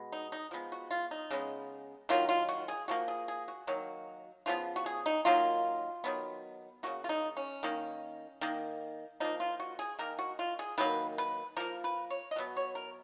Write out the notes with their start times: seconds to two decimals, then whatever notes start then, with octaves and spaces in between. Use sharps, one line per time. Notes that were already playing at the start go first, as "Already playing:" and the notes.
Already playing: B2 G#3 B3
0.12 D#4
0.32 D#4
0.51 F3 G#3 B3
0.72 F#4
0.91 F4
1.11 D#4
1.30 C#3 G#3 B3
2.09 D#3 F#3 A#3 F4
2.29 F4
2.49 F#4
2.68 G#4
2.88 F3 A#3 F#4
3.08 G#4
3.28 G#4
3.48 F#4
3.67 D#3 F#3 A#3 F#4
4.46 C#3 F3 G#3 B3 F4
4.76 F#4
4.86 G#4
5.06 D#4
5.25 D#3 F#3 A#3 F4
6.04 D#3 F#3 B3
6.83 C#3 F3 A#3 F#4
7.04 F4
7.09 D#4
7.37 C#4
7.63 D#3 A#3
8.41 D#3 A#3
9.20 F3 A#3 D#4
9.40 F4
9.60 F#4
9.79 G#4
9.99 D#3 A#3 A#4
10.19 F#4
10.39 F4
10.59 G#4
10.78 D#3 F#3 A#3 B4
11.18 B4
11.57 F3 A#3 A#4
11.84 B4
12.10 C#5
12.31 D#5
12.36 B2 F#3 B3
12.57 C#5
12.75 A#4